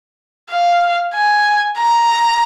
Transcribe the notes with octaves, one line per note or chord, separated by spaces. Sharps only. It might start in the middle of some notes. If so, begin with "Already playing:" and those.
F5
G#5
A#5